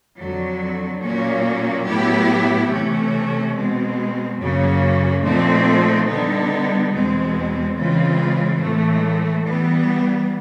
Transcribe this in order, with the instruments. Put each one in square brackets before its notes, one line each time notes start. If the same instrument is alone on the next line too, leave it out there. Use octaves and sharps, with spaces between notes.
[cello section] F2 D3 F#3
A#2 F#3 A#3 C#4
A2 F#3 B3 E4 G4
C3 E3 A3 C#4
B2 G#3 C4
F#2 C#3 F#3 A#3 C#4
A#2 F3 A3 C4 D#4
D3 G3 B3 D#4
E2 B2 G#3 C4
C#3 E3 G#3 C4 F4
A2 E3 A3
E3 G3 B3